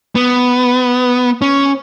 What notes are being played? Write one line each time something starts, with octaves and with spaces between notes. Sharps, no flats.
B3
C#4